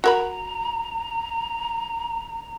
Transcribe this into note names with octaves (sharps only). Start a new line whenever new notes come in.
F#4 A#4 A#5 B5